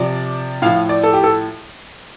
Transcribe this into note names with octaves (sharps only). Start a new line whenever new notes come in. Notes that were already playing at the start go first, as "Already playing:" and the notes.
Already playing: C3 F3 D5
A2 F3 F5
D5
A4
G4
A4